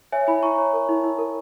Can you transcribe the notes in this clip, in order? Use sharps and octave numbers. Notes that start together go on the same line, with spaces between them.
C#5 E5 G#5
E4 G#5 B5
E4 A#5 C#6
C#5
A#4
E4
E4
A#4